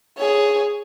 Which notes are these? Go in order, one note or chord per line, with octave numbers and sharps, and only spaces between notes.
G#4 C#5